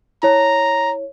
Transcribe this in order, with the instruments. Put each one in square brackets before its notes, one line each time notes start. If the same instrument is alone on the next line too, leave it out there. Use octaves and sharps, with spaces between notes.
[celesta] E4 C#5 [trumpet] A#5